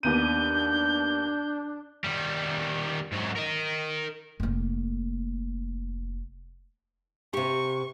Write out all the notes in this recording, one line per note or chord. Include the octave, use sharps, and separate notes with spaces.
D#2 B3 D4 G6 D#7
D#3 G3
G#2 F#3
A#4 D#5
F1 A#3
C3 G4 C#6